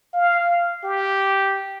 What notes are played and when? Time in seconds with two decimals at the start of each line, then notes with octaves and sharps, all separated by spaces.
0.14 F5
0.84 G4